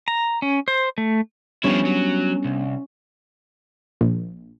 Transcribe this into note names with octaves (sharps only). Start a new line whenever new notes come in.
A#5
C#4
C5
A3
F3 G3 B3 C#4 D4 E4
F#3
C2
A#1